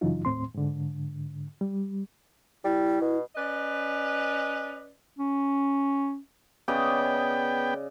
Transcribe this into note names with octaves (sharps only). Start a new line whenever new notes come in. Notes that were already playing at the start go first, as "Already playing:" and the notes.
F#2 C#3 E3 F#3 D#4 F4
D#2 A2 C4 C6
G#2 D3
G3
G3 E4
B2
C#4 B4 D5 D#5
C#4
C#3 B3 D5 D#5 G5